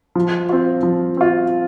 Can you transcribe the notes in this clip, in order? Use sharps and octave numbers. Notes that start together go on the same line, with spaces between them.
F3
C4 F4
F3
C4 F4